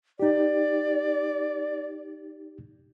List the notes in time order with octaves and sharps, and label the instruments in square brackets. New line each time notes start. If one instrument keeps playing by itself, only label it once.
[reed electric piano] D#4 G4 [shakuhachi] D5